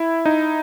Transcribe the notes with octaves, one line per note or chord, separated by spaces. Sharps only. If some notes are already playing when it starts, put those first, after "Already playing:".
Already playing: E4
D#4